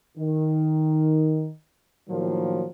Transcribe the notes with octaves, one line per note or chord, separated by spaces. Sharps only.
D#3
A2 D#3 F3 F#3 A#3